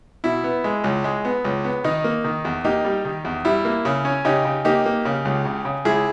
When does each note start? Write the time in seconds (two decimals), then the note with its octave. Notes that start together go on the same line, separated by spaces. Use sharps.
0.24 B2 E4
0.44 B3
0.64 G#3
0.84 C#2
1.04 G#3
1.25 B3
1.45 C#2
1.64 B3
1.84 D#3 D#4
2.04 A#3
2.24 D#3
2.45 E2
2.64 A#3 D#4 G4
2.85 G3
3.05 D#3
3.25 E2
3.45 G3 E4
3.65 A#3
3.85 C#3
4.05 C#4
4.25 C#3 D#4 G4
4.45 C#3
4.65 A#3 D#4 G4
4.85 A#3
5.05 C#3
5.25 C#2
5.45 C#3
5.65 C#3
5.85 C#2 E4 G#4